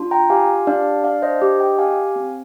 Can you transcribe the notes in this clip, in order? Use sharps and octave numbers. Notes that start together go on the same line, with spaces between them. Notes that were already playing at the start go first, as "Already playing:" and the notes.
Already playing: D4 F4
G5 A#5
G4 F5 G#5
D4 D5 F5
D4 D5 F5
C5 D#5
G4
D#5 G5
G4 F5 G#5
C4